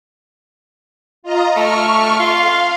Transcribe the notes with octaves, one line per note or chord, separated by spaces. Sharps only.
F4 D#5 A#5
A3 C#6 F6
F4 F5